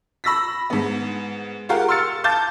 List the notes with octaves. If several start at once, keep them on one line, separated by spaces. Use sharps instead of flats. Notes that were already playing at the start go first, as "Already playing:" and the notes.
B5 E6 A#6 B6
G#2 B3
F4 G4 G#4 A#4 F5 F#5
C6 E6 F6 A6 C#7
F5 A5 D6 G6 A6